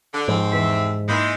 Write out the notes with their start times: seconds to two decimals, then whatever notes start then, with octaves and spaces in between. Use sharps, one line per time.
0.14 D3
0.28 D#2 G#2 F3 C4
0.52 E2 E3 E5 G6
1.08 G#2 E3 G#3 A#3 D#4 C5